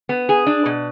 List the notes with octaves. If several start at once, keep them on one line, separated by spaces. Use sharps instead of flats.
B3
G#4
D4
B2